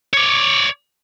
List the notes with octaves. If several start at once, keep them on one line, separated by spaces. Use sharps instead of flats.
C#5 D5